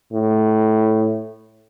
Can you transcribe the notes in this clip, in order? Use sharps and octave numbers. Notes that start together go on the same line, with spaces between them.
A2